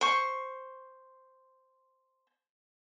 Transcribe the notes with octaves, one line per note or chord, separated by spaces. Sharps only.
C5 C#6